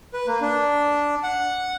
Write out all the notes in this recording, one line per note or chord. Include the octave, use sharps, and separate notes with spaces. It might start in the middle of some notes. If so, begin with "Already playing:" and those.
B4
A#3
D4
F#5